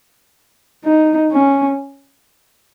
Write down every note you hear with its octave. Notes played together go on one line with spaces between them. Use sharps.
D#4
C#4